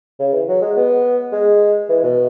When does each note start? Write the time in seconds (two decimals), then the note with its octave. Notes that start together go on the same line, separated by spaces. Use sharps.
0.19 C#3
0.33 E3
0.48 F#3
0.61 G#3
0.76 B3
1.32 G#3
1.89 E3
2.03 B2